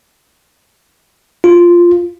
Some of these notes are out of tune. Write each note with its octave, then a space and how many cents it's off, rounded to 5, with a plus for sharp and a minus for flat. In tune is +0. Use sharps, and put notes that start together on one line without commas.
F4 -5